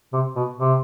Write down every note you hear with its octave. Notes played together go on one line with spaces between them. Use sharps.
C3
B2
C3